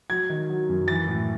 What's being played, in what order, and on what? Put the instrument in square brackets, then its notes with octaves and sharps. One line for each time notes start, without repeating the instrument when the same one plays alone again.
[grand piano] F#3 G#6
D#3
F#3
F#2
E3 A6
A2